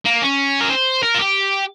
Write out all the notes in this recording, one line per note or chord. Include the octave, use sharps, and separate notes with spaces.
A#3
C#4
A#4
C5
A#4
F4
G4